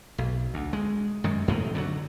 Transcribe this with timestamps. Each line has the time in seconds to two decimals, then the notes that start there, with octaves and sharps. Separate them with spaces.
0.18 B1
0.54 D2
0.73 G#3
1.24 F#2 D#3 G#3
1.48 F2 A2 C3 D#3
1.75 D3 D#3 F#3